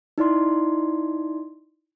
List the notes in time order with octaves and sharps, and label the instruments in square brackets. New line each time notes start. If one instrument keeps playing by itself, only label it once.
[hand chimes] D#4 E4 D5 C6